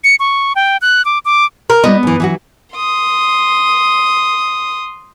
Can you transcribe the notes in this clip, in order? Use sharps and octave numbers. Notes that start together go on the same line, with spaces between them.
C#7
C#6
G5
F#6
D6
D6
A#4
G3 B3 E4 D#5
F#2 E3
E3 F#3 F#4
C6 D#6